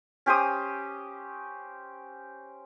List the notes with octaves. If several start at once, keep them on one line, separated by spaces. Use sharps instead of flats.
C#4 G4 C5 D#6